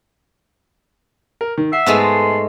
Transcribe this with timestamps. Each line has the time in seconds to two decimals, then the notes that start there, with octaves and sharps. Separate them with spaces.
1.41 A#4
1.58 D#3
1.73 E5 F#5 C7
1.86 G#2 G#3 A3 B3 G#4
2.04 C6